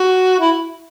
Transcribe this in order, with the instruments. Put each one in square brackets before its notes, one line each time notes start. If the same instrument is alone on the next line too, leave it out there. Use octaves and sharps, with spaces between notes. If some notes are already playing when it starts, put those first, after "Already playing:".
Already playing: [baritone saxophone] F#4
E4